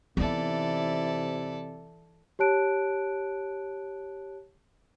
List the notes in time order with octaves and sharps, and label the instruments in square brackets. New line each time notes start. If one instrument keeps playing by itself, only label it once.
[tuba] C3 [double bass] E3 E4 [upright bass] B3 D#4 [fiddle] A4 D5
[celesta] G4 C#5 A5 F#6 D7